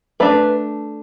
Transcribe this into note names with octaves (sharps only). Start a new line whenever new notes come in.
A3 D4 B4